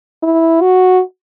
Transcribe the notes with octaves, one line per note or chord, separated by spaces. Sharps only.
E4
F#4